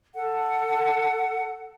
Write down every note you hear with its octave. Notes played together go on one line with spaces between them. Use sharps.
A4 F#5